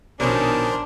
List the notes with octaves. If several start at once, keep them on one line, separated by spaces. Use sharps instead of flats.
A#1 B2 D#3 C#4 D4 A#4 C5 A5